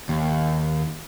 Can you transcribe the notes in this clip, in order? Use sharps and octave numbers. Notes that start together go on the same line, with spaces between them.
D#2